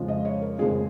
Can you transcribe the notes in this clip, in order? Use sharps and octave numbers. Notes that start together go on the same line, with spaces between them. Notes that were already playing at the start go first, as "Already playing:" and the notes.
Already playing: F2 C#3 F3 G#3
D#5
C#5
A#4
F2 C#3 F3 G#3 G#4